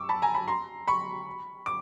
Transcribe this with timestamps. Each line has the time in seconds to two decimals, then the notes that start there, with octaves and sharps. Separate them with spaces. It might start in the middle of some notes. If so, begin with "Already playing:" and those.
Already playing: C#6 D6 E6
0.09 A5 B5
0.22 G#5 A#5
0.35 A5 B5
0.48 A#5 C6
0.88 B5 C#6
1.66 D6